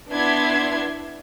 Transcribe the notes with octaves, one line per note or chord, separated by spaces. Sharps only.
B3 D4 E4 E5 C6 G#6